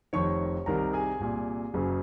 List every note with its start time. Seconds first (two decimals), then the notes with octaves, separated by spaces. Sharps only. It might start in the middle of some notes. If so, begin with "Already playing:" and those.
0.13 F1 F2 D#3 C#5 C#6
0.66 C2 C3 D#3 A#4 A#5
0.93 G#4 G#5
1.20 C2 A#2
1.74 F#1 F#2 C#3